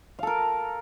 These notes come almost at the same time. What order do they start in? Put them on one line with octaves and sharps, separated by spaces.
F5 A4 A#4